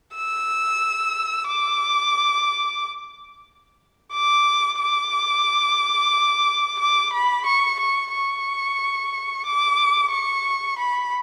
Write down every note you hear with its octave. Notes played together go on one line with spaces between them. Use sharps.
E6
D6
D6
D6
D6
B5
C#6
C#6
C#6
D6
C#6
B5